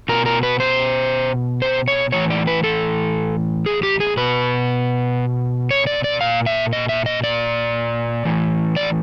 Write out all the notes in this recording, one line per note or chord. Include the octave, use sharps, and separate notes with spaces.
B2 A#4
A#4
B4
C5
C5
C#5
A2 E3 C#5
D5
B4
A4
G#4
G4
G#4
B2 B4
C#5
D5
D5
A#2 F5
E5
D#5
E5
D#5
D5
A2 E3
D5